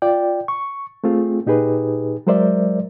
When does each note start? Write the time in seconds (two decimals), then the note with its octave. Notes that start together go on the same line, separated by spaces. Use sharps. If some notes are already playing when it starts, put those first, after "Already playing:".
0.02 F4 D5 G5
0.48 C#6
1.04 A3 C4 F4 G#4
1.47 A#2 D#4 G4 G#4 B4
2.27 F#3 G#3 A#4 C5 D5 E5